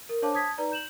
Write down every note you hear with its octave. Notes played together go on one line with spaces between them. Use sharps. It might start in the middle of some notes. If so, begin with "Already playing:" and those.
A#4
D4 C5 C#5 F5 A5 D6
A5 D#6 G#6 B6
D#4 B4 D5 A#5
G6 E7 F#7